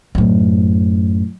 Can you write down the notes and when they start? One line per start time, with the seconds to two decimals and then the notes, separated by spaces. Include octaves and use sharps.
0.15 F#2 A2